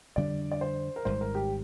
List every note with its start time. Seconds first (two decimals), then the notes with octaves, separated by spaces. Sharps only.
0.16 F2 D3 G3 D4 D5
0.52 D5
0.61 C5
0.96 A#4
1.05 G#1 G#2 G3 C5
1.21 A#4
1.35 G4